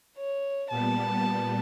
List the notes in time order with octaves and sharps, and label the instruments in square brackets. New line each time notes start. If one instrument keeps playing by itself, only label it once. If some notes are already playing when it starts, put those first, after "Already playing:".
[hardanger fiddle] C#5
[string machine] A#2 G3 B3 [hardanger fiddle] A5